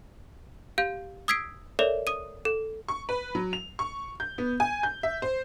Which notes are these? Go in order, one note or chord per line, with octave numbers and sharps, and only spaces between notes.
G4 F5 G6
D#6 E6 G#6 B6 C7 D7
A4 A#4 C#5 D5 E5
D#6 D#7
A4
C#6
B4
F#3
F7
C#6
G6
B3
G#5
G6
E5
C5